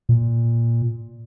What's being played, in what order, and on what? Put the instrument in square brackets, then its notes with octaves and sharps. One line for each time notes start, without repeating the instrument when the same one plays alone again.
[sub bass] A#2